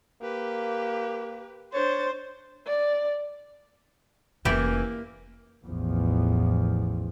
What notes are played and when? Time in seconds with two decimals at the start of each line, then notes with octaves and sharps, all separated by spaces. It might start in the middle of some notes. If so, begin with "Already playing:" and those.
0.22 A#3 G4 B4
1.74 D4 C5 C#5 A6
2.67 D5
4.45 F1 E3 A#3 C#4 E4 G4 D5
5.63 A1 E2 F3